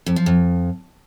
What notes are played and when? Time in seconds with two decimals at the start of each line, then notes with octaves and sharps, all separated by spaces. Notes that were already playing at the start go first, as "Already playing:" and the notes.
0.06 F2
0.16 F3
0.26 F2